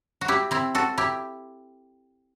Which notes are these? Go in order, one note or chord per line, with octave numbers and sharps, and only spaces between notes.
F#4
E4 G4
C4 E4
F#4 A4
E4 G4